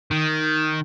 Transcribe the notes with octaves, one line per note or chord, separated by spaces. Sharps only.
D#3